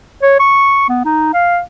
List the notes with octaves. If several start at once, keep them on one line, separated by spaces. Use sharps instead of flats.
C#5
C#6
B3
D#4
F5